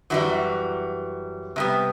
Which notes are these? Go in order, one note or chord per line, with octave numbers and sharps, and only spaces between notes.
F#2 E3 G3 F#4
C3 G3 B3